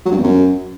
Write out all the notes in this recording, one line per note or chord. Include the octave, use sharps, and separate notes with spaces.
F#3
G2
E2
F#2